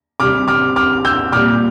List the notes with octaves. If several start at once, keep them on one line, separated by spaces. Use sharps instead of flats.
C3 G3 D6 F6
D6 F6
D6 F6
E6 G6
A#2 G3 D6 F6